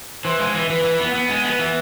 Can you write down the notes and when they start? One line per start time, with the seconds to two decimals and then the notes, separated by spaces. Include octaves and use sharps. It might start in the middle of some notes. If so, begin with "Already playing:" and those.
0.24 E3 C5
0.39 G#3
0.54 E3
0.70 E3 B4
0.84 E3
0.99 B3
1.14 B3
1.29 G#3
1.44 B3
1.59 E3